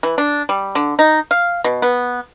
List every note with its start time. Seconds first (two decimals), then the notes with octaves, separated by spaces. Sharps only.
0.03 E3
0.18 D4
0.49 G3
0.75 D3
0.99 D#4
1.31 F5
1.64 B2
1.82 B3